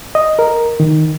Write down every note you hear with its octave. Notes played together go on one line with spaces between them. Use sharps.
D#5
A#4
D#3